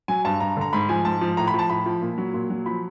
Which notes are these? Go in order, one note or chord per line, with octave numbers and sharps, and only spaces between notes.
F#3 G#5
G2 A5
G2 A#5
D3 A#5
G#2 B5
F3 G#5
G#2 A5
F3
A2 A#5
B5
F3 A5
A2 B5
F3
A#2
F#3
A#2
F#3
F3 B5